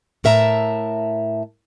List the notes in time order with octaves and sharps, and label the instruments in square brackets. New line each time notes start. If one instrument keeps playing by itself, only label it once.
[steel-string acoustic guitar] A2 A#4 E5 A5 A#5